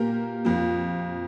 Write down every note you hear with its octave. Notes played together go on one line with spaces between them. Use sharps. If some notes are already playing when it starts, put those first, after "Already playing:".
Already playing: A#2 A#3 G4 A#4
F2 F3 A#3